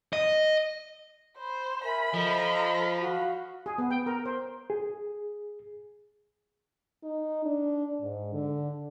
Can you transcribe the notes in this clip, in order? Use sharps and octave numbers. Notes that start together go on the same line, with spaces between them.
D#5
C5 B5
A#4 E5 G#5 B5
F3 A4 D#5
F#4 F5
G#4
B3
G5
A#4
C5
G#4
D#4
D4
G#2
D3